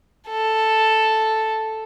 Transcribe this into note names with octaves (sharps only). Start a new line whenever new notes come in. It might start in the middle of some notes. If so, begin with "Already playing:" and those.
A4